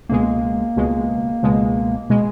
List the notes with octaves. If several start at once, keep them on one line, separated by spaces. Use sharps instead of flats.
C#2 B2 G#3 A#3
C#2 B2 G#3
C#2 B2 G#3
B2 G#3